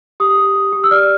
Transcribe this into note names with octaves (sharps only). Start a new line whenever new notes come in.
G4 D#6
G4
G4
G4
E6
D5 F6